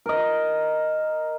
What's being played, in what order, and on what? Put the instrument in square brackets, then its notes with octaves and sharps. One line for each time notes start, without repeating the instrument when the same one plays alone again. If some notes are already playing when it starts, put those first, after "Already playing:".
[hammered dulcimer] A#4 D#5